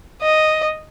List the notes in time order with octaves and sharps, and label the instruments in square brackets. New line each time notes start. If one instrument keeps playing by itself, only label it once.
[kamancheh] D#5